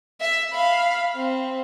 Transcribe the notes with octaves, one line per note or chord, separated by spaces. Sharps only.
E5
F5 B5
C4